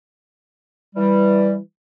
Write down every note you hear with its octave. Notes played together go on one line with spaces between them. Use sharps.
E3 G3